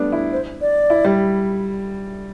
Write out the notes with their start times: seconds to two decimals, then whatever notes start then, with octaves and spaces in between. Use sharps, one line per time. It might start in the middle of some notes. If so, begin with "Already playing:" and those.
Already playing: G3 A3 B3 D4
0.12 E4
0.32 C5
0.61 D5
0.90 E4
1.05 G3